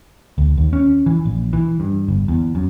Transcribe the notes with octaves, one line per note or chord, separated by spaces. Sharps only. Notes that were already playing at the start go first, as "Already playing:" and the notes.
D2
D#2
C#4
E3
A#1
E3
G2
G1
E2
F#2